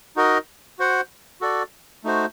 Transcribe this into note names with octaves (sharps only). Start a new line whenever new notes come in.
D#4 F#4 A#4 D#5
F#4 C5 F#5
F#4 A4 D5
A3 D#4 F#4 C5